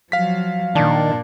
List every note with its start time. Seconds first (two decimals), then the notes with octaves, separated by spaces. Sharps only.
0.12 F3 F#3 F5 B6
0.75 A#2 D#3 D4